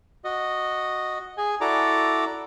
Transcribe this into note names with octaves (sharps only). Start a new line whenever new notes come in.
F#4 D#5
G#4 G#5
E4 F#4 A4 D5 A#5 D6